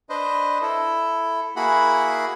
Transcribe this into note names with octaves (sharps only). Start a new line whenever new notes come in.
D4 B4 C5 D#5
E4 A4
A#3 E4 F#4 G#4 F#5 B5